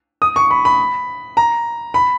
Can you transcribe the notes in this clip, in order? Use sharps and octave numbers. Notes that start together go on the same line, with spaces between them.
D#6
C#6
B5
B5
A#5
B5